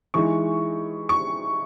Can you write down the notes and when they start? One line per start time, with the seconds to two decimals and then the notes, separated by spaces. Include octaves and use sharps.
0.14 E3 G#3 D#4 C#6
1.09 C#6